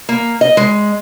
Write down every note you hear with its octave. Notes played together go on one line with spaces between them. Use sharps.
A#3
D#5
G#3